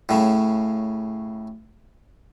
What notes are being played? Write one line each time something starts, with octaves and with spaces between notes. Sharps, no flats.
A2 C#3